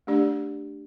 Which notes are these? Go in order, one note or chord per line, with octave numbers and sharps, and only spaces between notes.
A3 D4 G4 D5